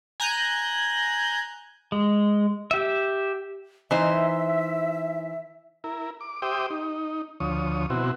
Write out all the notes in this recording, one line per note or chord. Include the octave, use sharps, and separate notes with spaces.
G#5 A#5 F#6 G6
G#3
G4 E5
E3 D#4 C5 E5
E4 A#4
D6
G4 C5 E5 G5 D6 D#6
D#4
D2 F3 C#5 D#6
B2 C4 E4 F#4